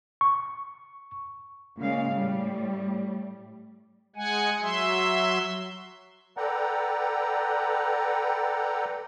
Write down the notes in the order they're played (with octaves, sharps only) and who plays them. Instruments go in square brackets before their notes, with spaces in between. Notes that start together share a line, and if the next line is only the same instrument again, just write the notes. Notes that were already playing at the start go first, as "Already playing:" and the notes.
[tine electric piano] C#6
[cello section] A#2 C#3 G#3 F5
A2 G3
[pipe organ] G#3 F#5 G#5
F#3 E5 C6
[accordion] A4 B4 D5 F#5 G5 A#5